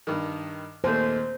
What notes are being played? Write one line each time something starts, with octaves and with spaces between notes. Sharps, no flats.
G2 D#3
D#2 A#2 A3 C5